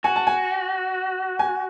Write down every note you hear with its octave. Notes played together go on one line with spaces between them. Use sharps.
F#4 G#5
A5
G#5
G#5